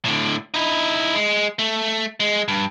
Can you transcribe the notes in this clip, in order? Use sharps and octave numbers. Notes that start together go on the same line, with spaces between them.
A2 D3
D#4 E4
G#3
A3
G#3
G2